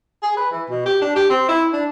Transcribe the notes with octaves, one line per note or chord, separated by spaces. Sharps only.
G#4
B4
E3
B2
G4
D4
G4
C4
E4
D4